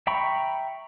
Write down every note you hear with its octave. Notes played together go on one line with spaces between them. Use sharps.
E5 G5 A#5 B5 C#6